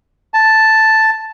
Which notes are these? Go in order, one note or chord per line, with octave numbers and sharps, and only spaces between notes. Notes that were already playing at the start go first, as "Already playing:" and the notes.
A5